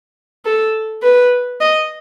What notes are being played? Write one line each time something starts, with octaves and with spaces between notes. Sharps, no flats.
A4
B4
D#5